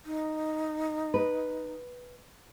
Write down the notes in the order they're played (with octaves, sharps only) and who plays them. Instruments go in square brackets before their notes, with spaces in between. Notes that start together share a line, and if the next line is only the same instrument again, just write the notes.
[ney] D#4
[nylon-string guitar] B4